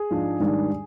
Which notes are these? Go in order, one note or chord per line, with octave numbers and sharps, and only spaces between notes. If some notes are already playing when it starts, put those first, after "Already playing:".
Already playing: G#4
G#2 F3 G#3 D4
G#2 D#3 G3 D4